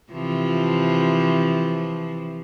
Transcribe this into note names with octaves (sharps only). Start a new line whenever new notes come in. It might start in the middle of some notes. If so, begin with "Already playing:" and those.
C3 E3 F3